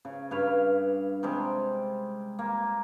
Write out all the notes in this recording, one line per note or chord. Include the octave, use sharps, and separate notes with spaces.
C#3
G2 B4 C#5 F5
C3 G3 G#3
A#3